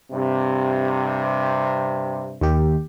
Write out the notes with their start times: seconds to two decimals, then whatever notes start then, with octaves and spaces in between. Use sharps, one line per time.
0.12 G2 C3
2.41 D#2 D#3 G4